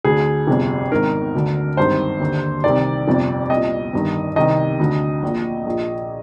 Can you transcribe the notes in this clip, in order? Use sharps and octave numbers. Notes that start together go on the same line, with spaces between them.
D2 D3 G#4
G1 F2 C3
G#1 G#2 D#3 A#4
D2 D3
G#1 G2 D#3 C5
D#2 D3
C2 C3 D#3 D5
G1 F2 C3
C2 A#2 D#5
G1 G2 D#3
C2 C3 D#3 D#5
D2 D3
A#1 A#2
A#1 A#2